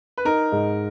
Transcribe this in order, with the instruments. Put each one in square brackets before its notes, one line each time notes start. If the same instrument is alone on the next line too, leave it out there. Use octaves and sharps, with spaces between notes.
[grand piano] B4
[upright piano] D#4 [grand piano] A#4
[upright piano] G#2